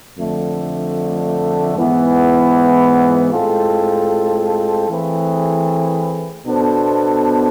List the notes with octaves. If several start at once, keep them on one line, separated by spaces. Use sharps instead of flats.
F2 D3 A3
G#2 E3 B3 E4
A2 G#3 C4 F4 A4
E3 A3 C4 G#4 B4
B2 B3 D4 A4 C5